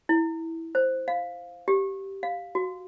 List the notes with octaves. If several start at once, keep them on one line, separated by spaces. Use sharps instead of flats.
E4
C5
F5
G4
F5
F#4